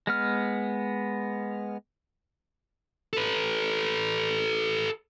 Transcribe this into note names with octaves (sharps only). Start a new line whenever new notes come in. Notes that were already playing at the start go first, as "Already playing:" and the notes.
G#3 B3 F6
A4 B4